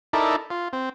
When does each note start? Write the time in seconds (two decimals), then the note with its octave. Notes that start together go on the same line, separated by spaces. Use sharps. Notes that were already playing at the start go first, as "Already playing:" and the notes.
0.13 D#4 E4 A4 A#4 D5
0.50 F4
0.73 C4